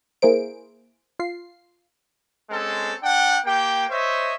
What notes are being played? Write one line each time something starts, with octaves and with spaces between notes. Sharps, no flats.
A#3 E4 G#4 A#4 C5 D7
F4 C7
G#3 C4 C#4 A4
D4 F#5 G5
A#3 G4 G5
C5 C#5 D#5 E5